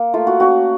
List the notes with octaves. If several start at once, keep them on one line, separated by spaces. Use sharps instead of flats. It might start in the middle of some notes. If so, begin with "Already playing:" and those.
Already playing: A#3
A3 F4
F#4
C#4 F#4